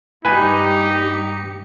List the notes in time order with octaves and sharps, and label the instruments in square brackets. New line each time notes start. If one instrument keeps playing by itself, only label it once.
[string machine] G2 G3 C#7 [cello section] A#3 G4 [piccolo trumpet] D#4 [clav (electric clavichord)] B4 G#5